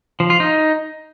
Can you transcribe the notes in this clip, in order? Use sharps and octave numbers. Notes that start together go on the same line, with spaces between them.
F3
F4
D#4